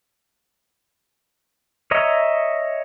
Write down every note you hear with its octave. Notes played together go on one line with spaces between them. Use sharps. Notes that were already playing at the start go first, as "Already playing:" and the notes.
C#5 D#5 E5 A#5